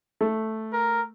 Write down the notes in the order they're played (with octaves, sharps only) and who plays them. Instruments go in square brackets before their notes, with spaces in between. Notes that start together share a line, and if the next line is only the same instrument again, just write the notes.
[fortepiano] A3
[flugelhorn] A#4